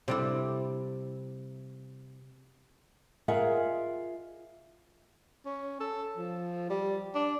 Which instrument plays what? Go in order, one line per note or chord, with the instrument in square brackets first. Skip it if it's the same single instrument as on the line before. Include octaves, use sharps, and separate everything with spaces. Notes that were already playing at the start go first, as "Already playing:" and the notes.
[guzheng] C3 G3 E4
[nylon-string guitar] F4 G#4 A#4 D#5 E5 F#5
[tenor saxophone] C#4
A4
F3
G3
D4